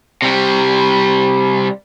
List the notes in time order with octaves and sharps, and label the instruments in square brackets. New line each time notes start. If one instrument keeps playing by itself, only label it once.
[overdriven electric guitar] C3 G3